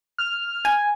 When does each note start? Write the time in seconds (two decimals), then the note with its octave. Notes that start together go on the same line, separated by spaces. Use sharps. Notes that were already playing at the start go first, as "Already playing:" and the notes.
0.18 F6
0.65 G#5